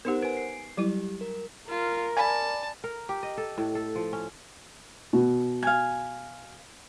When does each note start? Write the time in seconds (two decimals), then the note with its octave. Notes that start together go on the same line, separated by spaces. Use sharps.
0.05 B3 D#4 G4 A#4 C5 F#5
0.22 B4 G#5 D7
0.37 C7
0.77 F#3 G3 E4 G4
1.21 A#4
1.69 F4 A#4
2.17 D5 G#5 A5 B5
2.84 A#4
3.09 G4
3.23 D#5
3.38 A4
3.58 A2
3.75 A4
3.95 F3
4.13 C#4
5.13 B2
5.63 F5 G#5